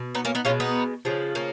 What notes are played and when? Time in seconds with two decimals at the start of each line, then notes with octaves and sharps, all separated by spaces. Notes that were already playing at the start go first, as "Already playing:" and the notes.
Already playing: B2
0.15 B3 D#4
0.25 A#3 C#4
0.35 B3 D#4
0.45 B2 G#3 C#4 F4
0.60 B3 D#4
1.05 C#3 F3 G#3
1.35 A#3 C#4